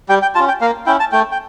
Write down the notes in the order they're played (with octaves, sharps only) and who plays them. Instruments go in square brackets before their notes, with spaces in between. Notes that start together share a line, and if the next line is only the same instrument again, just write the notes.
[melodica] G3 G5
G5
C#4 F4 A5
G5
A#3 F5
C#4 E4 G5
A5
A3 G5
G5